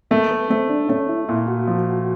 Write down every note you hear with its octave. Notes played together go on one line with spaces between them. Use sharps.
A3 A#3
B3
A3 C4
D4
A3 C#4
E4
A#2 E4
F#4
F3